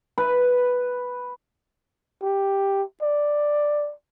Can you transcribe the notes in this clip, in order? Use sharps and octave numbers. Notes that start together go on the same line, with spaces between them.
B4
G4
D5